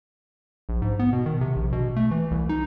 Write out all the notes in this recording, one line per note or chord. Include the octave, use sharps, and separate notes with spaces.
A#1
G#2
B3
B2
D#3
C3
A#1
B2
A3
E3
C2
D#4